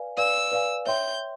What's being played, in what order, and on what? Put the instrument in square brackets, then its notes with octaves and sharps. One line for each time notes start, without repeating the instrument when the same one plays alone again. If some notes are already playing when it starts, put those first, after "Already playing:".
Already playing: [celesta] B4 D5 F5 G#5
[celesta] B4 D5 F5 G#5 [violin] E6
[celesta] B4 D5 F5 G#5
[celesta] C#5 E5 G5 C6 [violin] G6